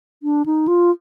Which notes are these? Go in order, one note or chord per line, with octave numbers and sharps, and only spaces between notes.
D4
D#4
F4